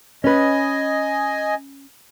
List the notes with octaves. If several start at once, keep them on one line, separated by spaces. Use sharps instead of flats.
C#4 B4 D#5 G#5